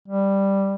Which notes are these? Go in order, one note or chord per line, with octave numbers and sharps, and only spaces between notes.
G3